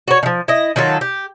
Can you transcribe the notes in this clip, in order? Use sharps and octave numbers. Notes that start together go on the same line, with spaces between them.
F#4 C#5
D#3 F3
E4 D#5
D#3 F#3 F4 A4
G4